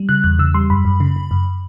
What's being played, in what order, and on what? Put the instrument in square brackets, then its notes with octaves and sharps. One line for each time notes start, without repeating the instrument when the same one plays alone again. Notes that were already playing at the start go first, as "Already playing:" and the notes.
Already playing: [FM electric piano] G3
C#3 F#6
E2 F#6
C#3 E6
G3 C6
F#2 B5
F#2
C#3
C#3
F#2